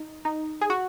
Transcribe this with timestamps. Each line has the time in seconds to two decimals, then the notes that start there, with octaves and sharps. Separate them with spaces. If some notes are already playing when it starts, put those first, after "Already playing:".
Already playing: D#4
0.25 D#4
0.61 G#4
0.70 F#4